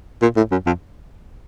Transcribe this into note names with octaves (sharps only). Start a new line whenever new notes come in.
A#2
A2
F#2
F2